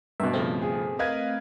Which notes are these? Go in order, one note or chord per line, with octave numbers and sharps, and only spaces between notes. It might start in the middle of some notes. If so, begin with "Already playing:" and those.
G2 B2 E5
C#3 F3 A3 C4
G#4
A#4 B4 D#5 F5 G#6 D#7